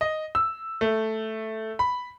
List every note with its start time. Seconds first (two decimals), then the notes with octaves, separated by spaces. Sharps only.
0.01 D#5
0.35 E6
0.81 A3
1.79 B5